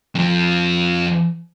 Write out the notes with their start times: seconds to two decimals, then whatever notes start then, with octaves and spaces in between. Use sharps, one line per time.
0.15 F2 F3